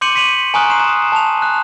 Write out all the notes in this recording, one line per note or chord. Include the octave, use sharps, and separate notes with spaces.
C6 D6 G6 C#7 D#7 F#7
C#6 B6 C#7 D#7 F7 F#7
G#5 A#5 C#6 D#6 F6 F#6
A#5 C6 C7 E7
A5 F7
F#6